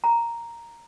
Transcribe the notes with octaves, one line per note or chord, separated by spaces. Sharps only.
A#5